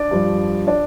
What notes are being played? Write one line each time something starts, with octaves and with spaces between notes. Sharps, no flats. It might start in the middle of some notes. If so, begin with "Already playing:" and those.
Already playing: D4 D5
G2 F3
D4 D5